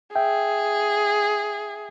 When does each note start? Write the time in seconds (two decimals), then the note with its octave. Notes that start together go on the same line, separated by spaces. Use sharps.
0.15 G#4 E5 G5